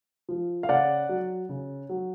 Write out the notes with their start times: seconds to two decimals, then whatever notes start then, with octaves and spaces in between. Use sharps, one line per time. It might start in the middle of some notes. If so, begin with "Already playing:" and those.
0.29 F3
0.63 F5
0.69 C#3 D5 F#5
1.09 F#3
1.49 C#3
1.89 F#3